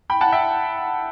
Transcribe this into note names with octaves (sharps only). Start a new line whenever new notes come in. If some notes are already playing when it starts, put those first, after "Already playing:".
G5 B5
F#5 A5
E5 G5